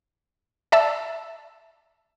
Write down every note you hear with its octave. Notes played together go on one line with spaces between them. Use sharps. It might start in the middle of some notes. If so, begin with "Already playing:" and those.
D5 E5 A5 E6